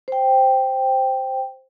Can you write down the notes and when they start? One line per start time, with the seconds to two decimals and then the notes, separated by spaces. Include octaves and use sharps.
0.08 C5 G5